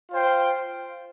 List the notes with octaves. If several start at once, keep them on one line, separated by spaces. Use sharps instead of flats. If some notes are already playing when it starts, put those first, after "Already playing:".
F4 C5 G5